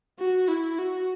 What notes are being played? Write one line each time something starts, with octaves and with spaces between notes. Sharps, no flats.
F#4
E4
F#4